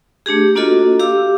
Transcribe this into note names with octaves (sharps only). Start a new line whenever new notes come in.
A3 D4 G4 G#4
A#3 D4 F4 F#4 A4 D#5
G4 F5 D6 E6